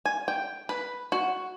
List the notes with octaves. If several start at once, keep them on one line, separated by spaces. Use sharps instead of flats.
G#5
G5
B4
F#4